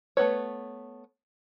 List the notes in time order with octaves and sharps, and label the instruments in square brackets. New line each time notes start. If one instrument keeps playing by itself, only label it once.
[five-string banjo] A3 B3 B4 C#5